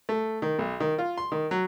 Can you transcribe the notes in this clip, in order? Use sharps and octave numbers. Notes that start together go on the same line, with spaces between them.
A3
D#3
B1
D#3
F4
C6
D#3
F#3